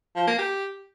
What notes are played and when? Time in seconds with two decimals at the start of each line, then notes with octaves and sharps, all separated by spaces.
0.16 F3
0.27 A#3
0.39 G4